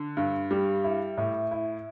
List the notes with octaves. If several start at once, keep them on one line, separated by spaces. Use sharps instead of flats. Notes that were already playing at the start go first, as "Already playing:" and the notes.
Already playing: D3
G2
G3
E4
A2
E4